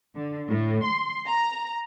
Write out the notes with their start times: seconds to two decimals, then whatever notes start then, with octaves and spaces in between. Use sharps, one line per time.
0.15 D3
0.48 A2
0.84 C6
1.27 A#5